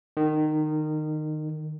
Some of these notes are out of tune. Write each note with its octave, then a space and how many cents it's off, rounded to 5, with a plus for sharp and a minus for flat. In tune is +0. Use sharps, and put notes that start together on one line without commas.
D#3 -20